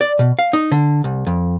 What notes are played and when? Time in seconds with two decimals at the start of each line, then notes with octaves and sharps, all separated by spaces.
0.01 D5
0.19 B2
0.39 F5
0.53 D#4
0.71 D3
1.04 C2
1.27 F2